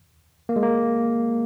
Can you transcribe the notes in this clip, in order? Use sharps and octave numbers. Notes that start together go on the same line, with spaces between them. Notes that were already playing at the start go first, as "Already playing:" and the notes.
A#3
G#3
A#3